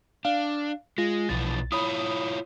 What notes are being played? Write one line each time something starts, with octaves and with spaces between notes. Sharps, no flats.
D4 F5
G#3 F4 A#6
B1 B2 E3 F3 A6
E4 F4 C#5 B5 D#6